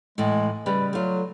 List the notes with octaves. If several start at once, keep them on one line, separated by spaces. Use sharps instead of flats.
A2 E3 G#3
C#3 G3 B4
F#3 A3 F4